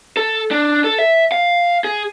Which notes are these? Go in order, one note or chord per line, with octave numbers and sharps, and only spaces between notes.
A4
D4
A4
E5
F5
G#4